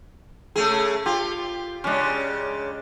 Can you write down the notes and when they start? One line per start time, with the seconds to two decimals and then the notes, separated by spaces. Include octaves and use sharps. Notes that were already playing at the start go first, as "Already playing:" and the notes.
0.56 C#3 A3 G#4
1.06 F4 G4
1.84 C#3 G#3 C#4 D4